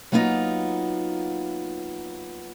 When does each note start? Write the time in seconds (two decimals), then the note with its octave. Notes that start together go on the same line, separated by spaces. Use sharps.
0.12 F#3 A#3 B3 D#4 F4